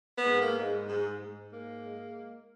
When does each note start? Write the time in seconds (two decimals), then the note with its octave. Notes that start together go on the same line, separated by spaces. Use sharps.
0.17 B3
0.25 G#2
0.40 A#3
0.57 G#2
0.89 G#2
1.21 G#2
1.52 A#3
1.84 G#3